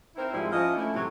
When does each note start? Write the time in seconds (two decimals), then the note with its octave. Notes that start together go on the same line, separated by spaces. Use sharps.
0.16 C4 D#4 E4 A#4 C5
0.33 G#2 F3 G3 G#3 C4 E4
0.51 F3 C#4 E4 D#5
0.75 A3 C#4 D4 E4
0.94 A2 C3 E3 F#3